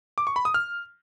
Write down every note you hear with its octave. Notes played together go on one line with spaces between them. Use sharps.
D6
C#6
B5
D#6
F6